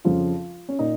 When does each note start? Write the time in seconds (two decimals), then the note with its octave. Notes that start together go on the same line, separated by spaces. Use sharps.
0.05 F2 C#3 F3 F4
0.69 C#4
0.79 A#2 D#4